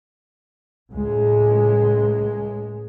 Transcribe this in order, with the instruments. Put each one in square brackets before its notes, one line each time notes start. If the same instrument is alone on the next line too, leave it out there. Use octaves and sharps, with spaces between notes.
[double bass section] C#2 A2 G#3